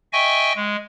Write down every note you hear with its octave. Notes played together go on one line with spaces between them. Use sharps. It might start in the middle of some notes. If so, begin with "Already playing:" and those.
D#5 E5 G5 G#5 C#6
G#3